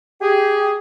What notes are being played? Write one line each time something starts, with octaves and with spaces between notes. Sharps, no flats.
G4 G#4